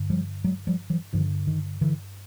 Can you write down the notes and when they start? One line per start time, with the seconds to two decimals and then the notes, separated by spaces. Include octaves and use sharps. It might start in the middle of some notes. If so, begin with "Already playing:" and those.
Already playing: G2 D3
0.10 F3 G3
0.44 F#3 G#3
0.67 F3 G3
0.90 E3 F#3
1.13 G2 D3 D#3 F3
1.47 D#3
1.81 D3 E3